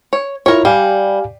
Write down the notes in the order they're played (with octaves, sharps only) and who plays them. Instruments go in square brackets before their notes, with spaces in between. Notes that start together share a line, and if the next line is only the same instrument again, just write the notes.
[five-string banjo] C#5
[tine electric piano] E4 F4 [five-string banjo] A#4 C#5
[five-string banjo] G3 [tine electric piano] G4 F5 G#5